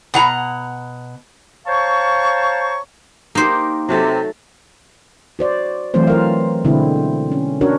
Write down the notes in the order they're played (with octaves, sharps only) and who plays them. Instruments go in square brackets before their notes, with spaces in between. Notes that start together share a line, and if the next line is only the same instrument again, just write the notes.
[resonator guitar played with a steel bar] B2 F#5 A#5
[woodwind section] C5 C#5 F5 A5 A#5 C#6
[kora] A#3 G4 [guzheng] D#4 C5
[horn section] C3 [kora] F#3 A3 A4
[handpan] F#4 C5 D5
E3 F#3 A3 C4 F4 C5
F4 A#4 F5
B2 D3 G#3 C4 E4
C#4
C#4 D4 F#4 A#4 C#5